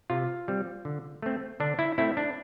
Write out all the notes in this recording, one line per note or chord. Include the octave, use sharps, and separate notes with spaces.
C3 F4
G3 C4
D3
A3 C4
D3 D4
E4
A3 C4 E4
D4